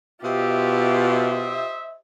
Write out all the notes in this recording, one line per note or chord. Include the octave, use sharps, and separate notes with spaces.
B2 F4 G4 C5 D#5 E5